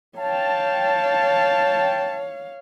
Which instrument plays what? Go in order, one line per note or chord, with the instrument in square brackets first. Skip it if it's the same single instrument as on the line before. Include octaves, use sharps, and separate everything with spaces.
[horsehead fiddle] C#5 F5 [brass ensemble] G5 A5